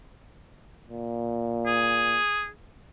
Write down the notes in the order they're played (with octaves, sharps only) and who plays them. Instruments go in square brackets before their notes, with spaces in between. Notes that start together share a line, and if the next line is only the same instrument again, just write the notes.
[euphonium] A#2
[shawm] G#4